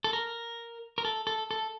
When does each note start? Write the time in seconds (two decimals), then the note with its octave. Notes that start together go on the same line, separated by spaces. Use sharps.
0.04 A4
0.13 A#4
0.98 A#4
1.05 A4
1.27 A4
1.51 A4